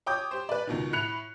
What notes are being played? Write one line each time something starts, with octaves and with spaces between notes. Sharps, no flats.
C#5 G5 D6 D#6 G6
G4 C5
B4 D5
C#2 B2 D#3
A2 B5 F#6 C#7 F7